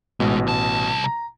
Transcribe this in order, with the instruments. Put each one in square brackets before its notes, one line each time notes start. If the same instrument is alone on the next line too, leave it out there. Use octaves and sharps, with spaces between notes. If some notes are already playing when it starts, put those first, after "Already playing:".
[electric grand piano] A1 B2 [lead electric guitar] G#2 G#3
[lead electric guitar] C2 A5
[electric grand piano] A#5